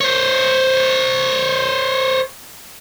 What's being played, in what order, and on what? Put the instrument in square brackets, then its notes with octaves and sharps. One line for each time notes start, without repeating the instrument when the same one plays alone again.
[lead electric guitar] C5 C#5